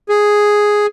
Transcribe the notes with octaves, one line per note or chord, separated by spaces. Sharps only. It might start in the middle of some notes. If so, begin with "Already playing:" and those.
G#4